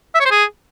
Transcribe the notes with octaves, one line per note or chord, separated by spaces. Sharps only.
E5
C#5
C5
G#4